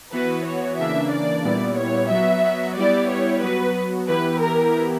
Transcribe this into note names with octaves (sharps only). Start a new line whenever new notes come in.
E3 B3 F#4 B4
C#5
C#3 E3 A#3 D4 E5
D5
A#2 G3 B3 E4
C#5
F#3 B3 F#4 E5
G3 B3 E4 G4 D5
C#5
F#3 B3 F#4 B4
E3 B3 E4 G4 B4
A#4